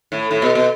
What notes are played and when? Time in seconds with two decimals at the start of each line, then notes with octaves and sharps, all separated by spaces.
0.12 A2
0.31 A2
0.42 B2
0.55 B2